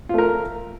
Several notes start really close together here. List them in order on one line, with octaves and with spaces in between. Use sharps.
F4 A3 A#4